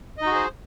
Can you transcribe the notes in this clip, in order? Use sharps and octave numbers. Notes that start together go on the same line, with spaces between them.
D#4 F#4 G#4 C5 D#5